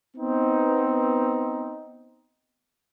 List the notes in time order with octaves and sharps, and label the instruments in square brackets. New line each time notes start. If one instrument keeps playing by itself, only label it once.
[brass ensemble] B3 C4 D#4